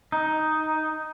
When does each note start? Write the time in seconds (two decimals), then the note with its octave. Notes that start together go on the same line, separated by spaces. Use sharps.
0.12 D#4